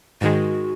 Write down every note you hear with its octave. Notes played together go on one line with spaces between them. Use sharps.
G#2 D#3 G#3 F#4